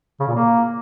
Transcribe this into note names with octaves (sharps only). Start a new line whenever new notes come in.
C#3
A#2
A#3